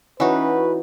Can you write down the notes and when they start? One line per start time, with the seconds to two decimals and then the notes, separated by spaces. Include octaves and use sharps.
0.20 E3 C#4 D#4 F#4 B4